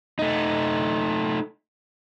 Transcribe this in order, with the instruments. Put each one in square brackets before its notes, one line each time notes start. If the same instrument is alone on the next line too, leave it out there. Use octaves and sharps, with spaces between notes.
[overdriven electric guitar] A3 D#4